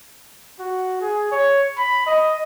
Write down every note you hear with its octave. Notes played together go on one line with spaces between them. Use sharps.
F#4
G#4
C#5
B5
D#5